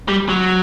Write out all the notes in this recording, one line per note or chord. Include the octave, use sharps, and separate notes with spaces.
G3
F#3